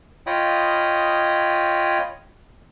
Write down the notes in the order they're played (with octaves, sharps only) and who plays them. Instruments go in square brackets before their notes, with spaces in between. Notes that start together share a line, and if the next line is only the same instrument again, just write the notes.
[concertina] F4 C#5 D#5 G5 B5 D#6